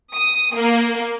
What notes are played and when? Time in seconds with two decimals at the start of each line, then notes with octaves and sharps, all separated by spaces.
0.14 D#6
0.55 A#3